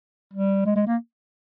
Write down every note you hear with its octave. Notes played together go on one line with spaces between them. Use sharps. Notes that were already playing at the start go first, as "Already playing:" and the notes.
G3
G#3
G#3
A#3